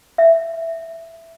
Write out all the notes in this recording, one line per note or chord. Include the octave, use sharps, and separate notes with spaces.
E5